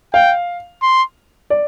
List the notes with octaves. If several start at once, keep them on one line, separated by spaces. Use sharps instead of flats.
F5 G5
C6
D5